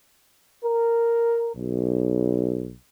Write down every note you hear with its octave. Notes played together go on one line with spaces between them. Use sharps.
A#4
B1